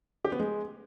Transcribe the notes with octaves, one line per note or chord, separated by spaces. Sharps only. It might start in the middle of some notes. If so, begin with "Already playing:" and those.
G4
B3
G#3